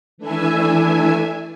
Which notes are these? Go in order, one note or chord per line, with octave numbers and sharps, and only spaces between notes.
E3 A3 D4 E4 E5 G#5